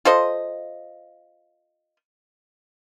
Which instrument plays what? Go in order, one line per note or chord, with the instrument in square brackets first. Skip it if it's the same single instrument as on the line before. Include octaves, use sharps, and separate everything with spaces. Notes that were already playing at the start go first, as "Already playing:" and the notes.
[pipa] F4 A4 C5 D#5